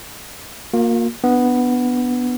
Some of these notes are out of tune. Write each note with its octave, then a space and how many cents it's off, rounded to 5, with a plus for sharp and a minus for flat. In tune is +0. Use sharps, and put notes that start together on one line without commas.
A#3 +0 F4 +45
B3 +0 D4 +0